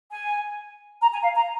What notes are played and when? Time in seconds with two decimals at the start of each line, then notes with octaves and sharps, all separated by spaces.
0.10 G#5
1.01 A#5
1.12 G#5
1.23 F5
1.35 A#5